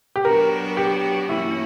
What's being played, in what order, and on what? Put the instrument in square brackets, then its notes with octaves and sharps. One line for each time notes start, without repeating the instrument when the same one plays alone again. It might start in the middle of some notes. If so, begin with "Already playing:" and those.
[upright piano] G4
[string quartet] F#3 B3 D4 F#4 [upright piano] A#4
[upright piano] G4
[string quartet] G2 E3 A#3 C#4 F#4 [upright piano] E4